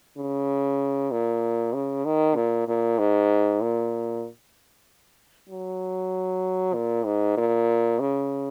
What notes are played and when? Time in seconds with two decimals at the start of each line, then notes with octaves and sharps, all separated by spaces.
0.17 C#3
1.11 A#2
1.74 C#3
2.05 D#3
2.36 A#2
2.68 A#2
2.99 G#2
3.61 A#2
5.49 F#3
6.74 A#2
7.05 G#2
7.37 A#2
8.00 C#3